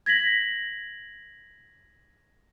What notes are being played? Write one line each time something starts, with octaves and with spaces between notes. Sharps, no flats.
G#6 A#6 B6 F#7